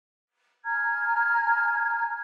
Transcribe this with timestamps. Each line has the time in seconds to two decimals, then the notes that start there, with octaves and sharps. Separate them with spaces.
0.64 G#5 A#5 F6 G#6